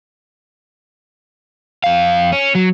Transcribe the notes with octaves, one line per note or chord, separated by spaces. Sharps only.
F2 F5
C#4
F#3